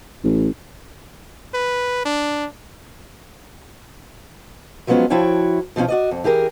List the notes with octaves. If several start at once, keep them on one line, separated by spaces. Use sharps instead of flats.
A1
B4
D4
F3 F#3 G#3 B3 C#4 F4
F3 E4 F#4 C#5 G5
B2 F3 G3 C#4 F4
F#4 D5 D#5
F2
E3 G4 G#4 A#4